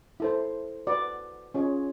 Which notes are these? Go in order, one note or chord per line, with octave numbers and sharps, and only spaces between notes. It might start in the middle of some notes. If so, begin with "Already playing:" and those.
E4 A4 C5
F#4 B4 D5
C#4 F4 G#4 C#5